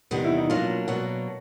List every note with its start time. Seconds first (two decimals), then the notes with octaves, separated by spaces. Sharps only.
0.11 E2 C3 D#3 G3 B3
0.25 E4
0.37 D#4
0.50 B2 F#3 A#3 D4 F4
0.87 B2 F#3 A#3 D4 F#4